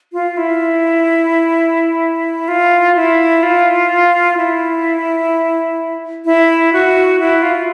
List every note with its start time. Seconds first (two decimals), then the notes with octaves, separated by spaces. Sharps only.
0.13 F4
0.37 E4
2.48 F4
2.96 E4
3.43 F4
4.37 E4
6.25 E4
6.73 F#4
7.19 E4
7.42 F4